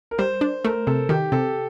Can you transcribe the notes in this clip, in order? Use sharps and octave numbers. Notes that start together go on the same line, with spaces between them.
A#4
G3 C5
D4
A3 A#4
C3 A4
D#3 G4
C3 A4